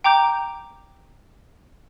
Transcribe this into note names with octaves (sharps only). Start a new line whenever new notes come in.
G5 A#5 D6 G6